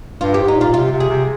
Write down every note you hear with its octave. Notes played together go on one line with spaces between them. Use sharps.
G2 F4
G#2 G4
D#4
A#2 F4
C3 F4
C3
G#4
C3